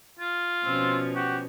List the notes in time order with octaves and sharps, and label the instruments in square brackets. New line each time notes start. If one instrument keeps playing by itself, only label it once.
[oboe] F4
[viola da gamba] B2 F3 C#4 [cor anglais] C4
[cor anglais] F#4 [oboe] G4